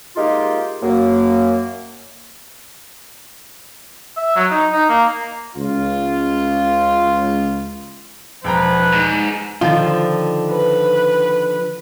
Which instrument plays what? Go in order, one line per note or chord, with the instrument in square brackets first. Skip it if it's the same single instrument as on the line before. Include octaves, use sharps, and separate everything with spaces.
[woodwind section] G#3 A#3 D#4 F4 G4
F#2 A#3
[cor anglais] E5
F#3
D#4
D#4
A#3
[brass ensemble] C#2 F4
[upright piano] E1 G5 A#5 [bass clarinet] F3 [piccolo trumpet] B4
[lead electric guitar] G#2
[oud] D3 D#3 F3 [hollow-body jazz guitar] F4
[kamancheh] B4